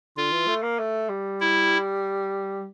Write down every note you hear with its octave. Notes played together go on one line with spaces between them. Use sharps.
D3 F4
E3
A3
A#3
A3
G3
E4